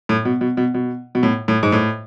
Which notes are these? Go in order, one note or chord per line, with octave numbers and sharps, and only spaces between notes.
A2
B2
B2
B2
B2
B2
A2
A2
G#2
A2